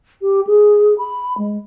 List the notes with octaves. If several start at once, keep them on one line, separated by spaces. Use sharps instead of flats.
G4
G#4
B5
G#3